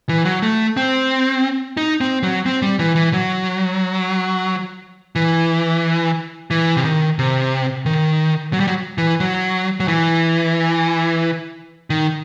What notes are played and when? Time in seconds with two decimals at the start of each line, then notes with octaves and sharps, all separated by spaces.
0.09 E3
0.25 F#3
0.43 A3
0.77 C4
1.77 D#4
2.01 C4
2.23 F#3
2.46 C4
2.62 G3
2.79 E3
2.96 E3
3.13 F#3
5.16 E3
6.51 E3
6.77 C3
6.85 D#3
7.19 C3
7.86 D#3
8.53 F#3
8.60 G3
8.67 F#3
8.98 E3
9.20 F#3
9.80 F#3
9.88 E3
11.90 D#3